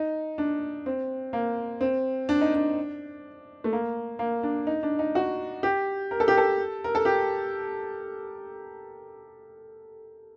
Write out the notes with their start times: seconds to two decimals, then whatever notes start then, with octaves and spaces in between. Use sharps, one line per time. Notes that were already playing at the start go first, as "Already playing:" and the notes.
Already playing: D#4
0.38 D4
0.86 C4
1.33 A#3
1.81 C4
2.29 D4
2.41 D#4
2.55 D4
3.64 A3
3.73 A#3
4.19 A#3
4.43 D4
4.67 D#4
4.83 D4
4.99 D#4
5.15 F#4
5.63 G4
6.11 A#4
6.20 A4
6.28 G4
6.37 A4
6.84 A#4
6.95 A4
7.05 G4